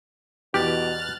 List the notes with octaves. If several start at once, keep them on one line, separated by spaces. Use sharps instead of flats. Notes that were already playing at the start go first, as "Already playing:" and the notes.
E2 B2 G4 F6 F#6 A6